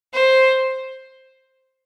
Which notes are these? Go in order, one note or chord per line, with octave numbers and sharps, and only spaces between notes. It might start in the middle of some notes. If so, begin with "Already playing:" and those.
C5